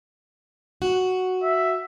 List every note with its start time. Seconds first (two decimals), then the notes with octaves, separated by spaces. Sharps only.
0.82 F#4
1.43 E5